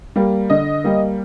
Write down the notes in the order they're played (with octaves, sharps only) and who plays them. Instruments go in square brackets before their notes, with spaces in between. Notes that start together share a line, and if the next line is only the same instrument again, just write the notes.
[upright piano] G3 A#3
D3 D#5
G3 A#3